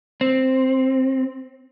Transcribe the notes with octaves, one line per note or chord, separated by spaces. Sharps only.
C4